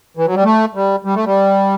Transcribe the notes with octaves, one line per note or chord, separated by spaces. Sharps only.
E3
F#3
G3
A3
G3
G3
A3
G3